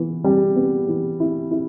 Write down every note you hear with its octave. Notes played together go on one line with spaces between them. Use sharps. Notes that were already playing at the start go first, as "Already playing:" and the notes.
Already playing: E3 B3
G3
B3
E3
E4
E4